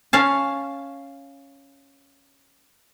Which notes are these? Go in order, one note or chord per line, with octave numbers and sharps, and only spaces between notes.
C#4 F5 A5